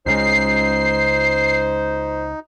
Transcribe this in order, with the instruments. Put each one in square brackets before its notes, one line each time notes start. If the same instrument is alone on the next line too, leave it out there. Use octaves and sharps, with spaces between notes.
[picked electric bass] C#2 C#3 G#3 [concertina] D#4 [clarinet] C5 [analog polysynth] C7